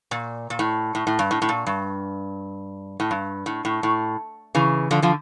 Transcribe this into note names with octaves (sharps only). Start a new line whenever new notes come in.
A#2
A#2
A2
A2
A2
G2
A2
A2
A#2
G2
A2
G2
A2
A2
A2
C#3 E3
D3 F3
D3 F3